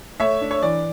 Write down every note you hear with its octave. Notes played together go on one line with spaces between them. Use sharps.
A3 C#5 E5
D4
C#5
E3 D5